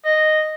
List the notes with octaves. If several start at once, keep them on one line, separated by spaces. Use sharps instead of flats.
D#5